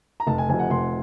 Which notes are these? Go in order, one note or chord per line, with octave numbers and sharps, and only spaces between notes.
A#5
F1 A5
G#5
F2 C3 G#5
F#5
F1 C6